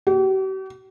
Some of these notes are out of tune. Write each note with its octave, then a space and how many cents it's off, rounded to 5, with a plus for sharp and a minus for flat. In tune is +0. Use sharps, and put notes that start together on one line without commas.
G4 -45